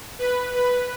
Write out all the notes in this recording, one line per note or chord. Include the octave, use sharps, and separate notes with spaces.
B4
B4